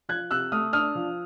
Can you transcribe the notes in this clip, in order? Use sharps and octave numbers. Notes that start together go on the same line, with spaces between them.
F3 F#6 G#6
C3 E6 F#6
A3 D#6 F6
D4 D#6 F6
F3